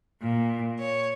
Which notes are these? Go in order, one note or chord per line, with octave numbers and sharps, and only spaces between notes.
A#2
C#5